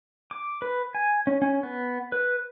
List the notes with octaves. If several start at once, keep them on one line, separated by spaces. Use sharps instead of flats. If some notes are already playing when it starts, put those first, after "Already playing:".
D6
B4
G#5
C#4
C#4
B3
B4